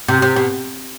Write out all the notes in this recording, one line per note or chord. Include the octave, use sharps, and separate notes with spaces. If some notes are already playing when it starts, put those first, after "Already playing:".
C3
C3
B2